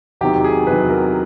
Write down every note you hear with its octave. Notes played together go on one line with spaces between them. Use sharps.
E2 C3 D#3 F#3 G4
G#4
E2 C3 D#3 F#3 B4
A#4